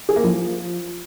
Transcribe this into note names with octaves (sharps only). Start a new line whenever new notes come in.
G#4
A#3
F3